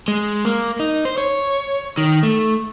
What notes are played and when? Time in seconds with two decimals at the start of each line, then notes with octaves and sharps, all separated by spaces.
0.08 G#3
0.45 A#3
0.80 D#4
1.05 C5
1.18 C#5
1.98 D#3
2.23 A3